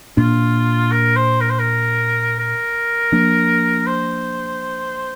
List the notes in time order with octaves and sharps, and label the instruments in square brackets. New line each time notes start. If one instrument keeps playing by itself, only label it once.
[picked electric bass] A#2 A#3 D4 [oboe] F4
[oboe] A#4
C5
A#4
C5
A#4
A#4
[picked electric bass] F3 A#3 D4
[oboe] C5